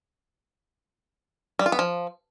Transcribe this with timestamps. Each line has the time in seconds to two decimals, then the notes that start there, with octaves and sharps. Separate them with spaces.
1.59 G3
1.66 F4
1.72 B3
1.79 F3